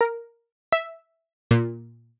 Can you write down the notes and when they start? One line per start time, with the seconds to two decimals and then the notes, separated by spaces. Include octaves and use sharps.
0.01 A#4
0.72 E5
1.51 A#2